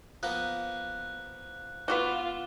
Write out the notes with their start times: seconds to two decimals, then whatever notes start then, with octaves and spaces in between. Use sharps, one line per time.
0.23 F3 A#3 B3 F#6
1.88 B3 F4 F#4 F#5 D6 G7